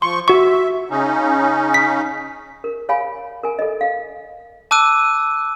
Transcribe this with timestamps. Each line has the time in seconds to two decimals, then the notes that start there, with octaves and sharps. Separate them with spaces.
0.02 F3 C6 C#6
0.28 F#4 E5 C#6
0.90 C#3 C#4 D#4
1.74 B6
2.64 A#4
2.89 C#5 F5 G#5 B5
3.43 A#4 G#5
3.59 A4 D#5
3.81 F5
4.71 A5 D6 E6 F#6 D#7